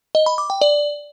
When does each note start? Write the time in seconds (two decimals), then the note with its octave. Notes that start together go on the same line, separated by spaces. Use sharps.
0.15 D#5
0.26 B5
0.38 D6
0.50 G5
0.61 D5